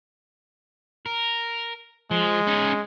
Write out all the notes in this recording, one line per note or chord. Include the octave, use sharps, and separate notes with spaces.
A#4
F3 G#3
C#4 D#4